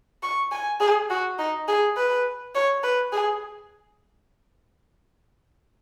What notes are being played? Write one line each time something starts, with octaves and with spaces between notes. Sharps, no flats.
C#6
G#5
G#4
F#4
D#4
G#4
B4
C#5
B4
G#4